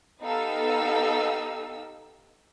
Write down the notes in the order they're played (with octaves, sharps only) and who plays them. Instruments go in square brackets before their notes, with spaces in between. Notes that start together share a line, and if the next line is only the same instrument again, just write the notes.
[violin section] B3 D#4 G4 A4 F5 E6